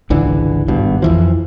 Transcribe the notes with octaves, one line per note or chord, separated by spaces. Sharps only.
G#1 C#2 D3 E3
G#1 G2 B2
F2 E3 F3